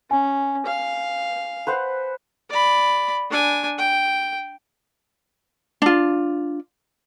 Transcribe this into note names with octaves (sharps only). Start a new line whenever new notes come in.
C#4 G#5
F5
B4 C5 F#5
D5 B5
D4 G#5
G5
D4 F4